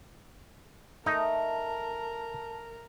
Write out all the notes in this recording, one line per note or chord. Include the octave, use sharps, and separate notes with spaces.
A3 D#4 A#4 A5 A#5